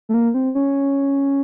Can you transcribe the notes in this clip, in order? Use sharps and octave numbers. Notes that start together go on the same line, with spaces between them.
A3
A#3
C4
C#4